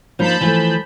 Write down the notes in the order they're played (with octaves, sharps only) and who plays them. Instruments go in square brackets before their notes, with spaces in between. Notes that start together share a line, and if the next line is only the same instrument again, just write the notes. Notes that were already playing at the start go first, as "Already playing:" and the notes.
[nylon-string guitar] F3 A#3 D#4 [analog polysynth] A5 B5 G6
[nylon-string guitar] E3 F3 A3